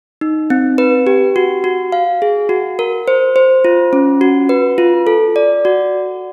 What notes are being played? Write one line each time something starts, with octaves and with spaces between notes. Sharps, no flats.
D#4
C4
B4
G4
F#4
F#4
F5
G#4
F#4
A#4
C5
C5
F4
C#4
F#4
B4
F4
A4
D5
F#4